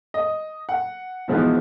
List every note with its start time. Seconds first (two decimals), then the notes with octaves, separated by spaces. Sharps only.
0.14 D#5
0.69 F#5
1.28 B2 E3 F3 G#3 B3 D#4